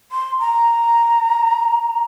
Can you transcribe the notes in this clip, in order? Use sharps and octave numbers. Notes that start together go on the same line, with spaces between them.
C6
A#5